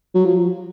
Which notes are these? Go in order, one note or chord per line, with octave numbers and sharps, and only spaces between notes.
F#3
F3